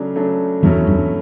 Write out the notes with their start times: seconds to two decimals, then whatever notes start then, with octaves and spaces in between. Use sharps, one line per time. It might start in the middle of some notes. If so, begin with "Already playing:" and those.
Already playing: C#3 F#3 A3 D4
0.15 C#3 F#3 A3 D4
0.63 E2 G2 B2 F#3 A3 C#4 E4
0.87 E2 G2